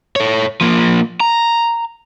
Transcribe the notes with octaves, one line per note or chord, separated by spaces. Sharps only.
A4 C#5
F3 A#3
A#5